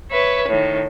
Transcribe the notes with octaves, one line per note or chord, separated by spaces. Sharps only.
B4 C#5 E5
A2 D#3